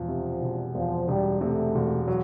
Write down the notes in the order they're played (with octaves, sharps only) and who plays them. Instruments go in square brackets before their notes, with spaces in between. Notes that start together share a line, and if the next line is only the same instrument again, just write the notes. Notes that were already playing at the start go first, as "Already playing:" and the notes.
Already playing: [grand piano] E1 E2 [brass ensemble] F3
[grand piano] C3
E1
[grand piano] E2 [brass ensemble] F3
[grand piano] E1 [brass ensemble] G3
[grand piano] C3 [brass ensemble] A3
[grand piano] E1
F#3